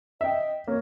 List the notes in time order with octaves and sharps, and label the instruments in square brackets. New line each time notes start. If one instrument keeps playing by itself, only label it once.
[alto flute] D#5 [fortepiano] E5 G5
[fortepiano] A#3 [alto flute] C#5